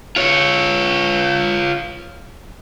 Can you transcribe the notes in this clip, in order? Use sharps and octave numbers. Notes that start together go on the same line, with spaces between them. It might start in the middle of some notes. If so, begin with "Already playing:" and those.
F4 C#5